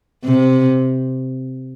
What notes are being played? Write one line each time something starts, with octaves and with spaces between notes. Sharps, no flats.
C3